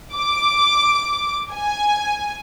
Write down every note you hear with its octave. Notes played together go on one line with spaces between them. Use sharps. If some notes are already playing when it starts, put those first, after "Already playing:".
D6
G#5